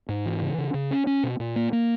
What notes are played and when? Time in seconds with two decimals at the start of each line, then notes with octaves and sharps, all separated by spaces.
0.09 G#2
0.25 E3
0.42 C#3
0.58 C#3
0.74 C#3
0.91 C#4
1.07 C#4
1.23 B2
1.40 A#2
1.56 A#3
1.73 A#3